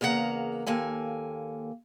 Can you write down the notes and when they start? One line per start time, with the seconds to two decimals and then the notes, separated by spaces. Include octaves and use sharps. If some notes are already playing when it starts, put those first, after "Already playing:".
0.01 E2 C#3 A#3 E4 F#5 A#5
0.66 D#2 A#3 A4 G#5